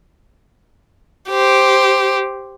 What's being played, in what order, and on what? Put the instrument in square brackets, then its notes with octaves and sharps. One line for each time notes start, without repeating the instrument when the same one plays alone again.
[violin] G4 C5